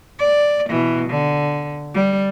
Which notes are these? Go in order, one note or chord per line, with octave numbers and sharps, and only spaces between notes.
D5
B2 E3
D3
G3